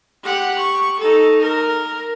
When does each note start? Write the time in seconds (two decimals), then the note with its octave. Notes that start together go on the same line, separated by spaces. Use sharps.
0.24 G4 F#5
0.59 C#6
1.00 D#4 A4
1.41 A#4